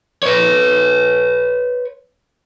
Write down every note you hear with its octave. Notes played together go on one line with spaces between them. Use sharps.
B4 C#5